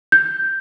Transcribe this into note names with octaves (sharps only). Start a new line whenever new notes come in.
G6